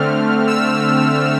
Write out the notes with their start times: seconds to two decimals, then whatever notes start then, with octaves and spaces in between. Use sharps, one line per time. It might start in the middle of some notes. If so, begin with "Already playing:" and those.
Already playing: D3 A3 C4 F6
0.47 E6